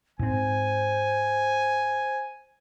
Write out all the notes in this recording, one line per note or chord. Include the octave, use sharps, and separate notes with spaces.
G#2 C4 C5 G#5